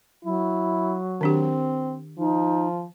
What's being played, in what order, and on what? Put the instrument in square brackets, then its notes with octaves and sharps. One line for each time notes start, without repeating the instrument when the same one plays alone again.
[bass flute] F#3 [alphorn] E4
[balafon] D#3 D4 G4 [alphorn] C4
[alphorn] F3 [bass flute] D#4